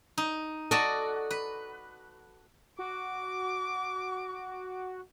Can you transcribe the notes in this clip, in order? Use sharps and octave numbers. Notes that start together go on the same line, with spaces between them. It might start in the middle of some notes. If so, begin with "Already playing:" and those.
D#4
F#4 A4 D5 D#5
B4
F#4 D6